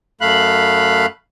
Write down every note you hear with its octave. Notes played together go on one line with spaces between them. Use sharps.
F#2 A3 F5 B5 F#6